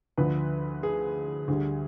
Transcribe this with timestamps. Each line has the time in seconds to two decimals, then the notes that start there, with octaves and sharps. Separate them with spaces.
0.18 D2 D3 F3 B4
0.83 G#4
1.48 D2 D3 G3